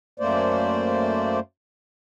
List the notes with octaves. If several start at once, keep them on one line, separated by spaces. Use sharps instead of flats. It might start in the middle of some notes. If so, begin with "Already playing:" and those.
F#2 A3 A#3 C5 D5